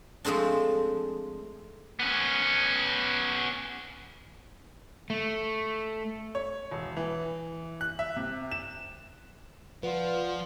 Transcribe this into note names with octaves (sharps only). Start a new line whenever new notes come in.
F3 G#3 A3 C4 D4
B3 C#4
A3
C#5
E1
E3
F#6
E5
C3
E7
F3 F4 B4 D5 F#5